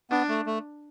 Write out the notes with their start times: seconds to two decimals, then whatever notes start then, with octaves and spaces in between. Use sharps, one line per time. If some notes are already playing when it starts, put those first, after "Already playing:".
0.10 B3 D4
0.29 A3
0.46 A3